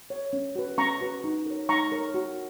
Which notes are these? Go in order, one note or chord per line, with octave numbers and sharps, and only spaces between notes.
C#5
C#4
F#4 B4
C#4 A#5 C#6
F#4 B4
D#4
A#4 C#5
D#4 A#5 C#6
A#4 C#5
F#4